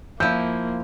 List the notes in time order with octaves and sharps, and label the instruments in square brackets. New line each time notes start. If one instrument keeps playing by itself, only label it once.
[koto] F3 E4 [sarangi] A#3 [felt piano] G6